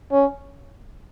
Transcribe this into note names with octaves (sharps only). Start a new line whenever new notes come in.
C#4